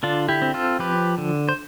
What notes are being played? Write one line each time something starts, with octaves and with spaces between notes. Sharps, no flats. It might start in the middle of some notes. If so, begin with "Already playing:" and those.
D3 D4 F4
E4 G4
C4
F4 A4
F3 G4 B4
D3
C5